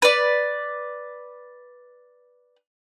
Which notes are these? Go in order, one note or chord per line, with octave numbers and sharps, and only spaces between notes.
B4 D5